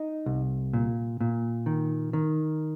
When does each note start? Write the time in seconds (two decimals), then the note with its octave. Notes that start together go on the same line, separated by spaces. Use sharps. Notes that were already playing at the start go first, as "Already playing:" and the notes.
Already playing: D#4
0.26 C2
0.73 A#2
1.21 A#2
1.66 D#3
2.13 D#3